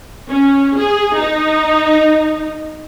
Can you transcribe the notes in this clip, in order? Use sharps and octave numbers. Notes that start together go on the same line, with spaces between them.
C#4
G#4
D#4